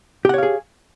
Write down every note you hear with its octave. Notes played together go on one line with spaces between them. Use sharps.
G4 G#4 C#5 F5 F#5